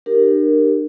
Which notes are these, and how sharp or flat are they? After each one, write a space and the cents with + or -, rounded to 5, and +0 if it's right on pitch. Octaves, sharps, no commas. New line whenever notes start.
D4 +45 G4 +0 A#4 +0